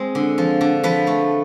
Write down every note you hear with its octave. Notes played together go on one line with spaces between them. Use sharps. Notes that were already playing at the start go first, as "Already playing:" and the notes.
Already playing: G#3 C4
D3
F3
D3
F3 B4
A3